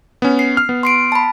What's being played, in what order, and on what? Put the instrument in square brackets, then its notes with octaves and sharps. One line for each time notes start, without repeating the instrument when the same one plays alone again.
[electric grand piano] B3 C#4
[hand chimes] C7
[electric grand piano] F6
B3
[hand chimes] C6 C7 D7
A5 B5